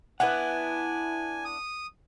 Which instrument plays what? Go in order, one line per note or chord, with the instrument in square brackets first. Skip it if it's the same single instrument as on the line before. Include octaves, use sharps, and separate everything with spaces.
[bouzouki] B3 D4 E4 [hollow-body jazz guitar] B4 F#5 [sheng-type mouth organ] G#5
[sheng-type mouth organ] D#6